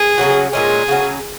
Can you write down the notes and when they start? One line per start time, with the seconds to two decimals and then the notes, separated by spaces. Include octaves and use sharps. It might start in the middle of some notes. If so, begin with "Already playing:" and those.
Already playing: G#4
0.18 C#3 F#3 C#4 F#4
0.53 A#2 G#3 C#4 G#4
0.88 C#3 F#3 C#4